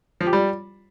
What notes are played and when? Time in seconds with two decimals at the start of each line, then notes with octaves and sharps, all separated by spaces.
0.21 F3
0.27 G4
0.33 G3